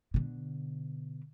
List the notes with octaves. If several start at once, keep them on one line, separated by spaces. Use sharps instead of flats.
B2 D3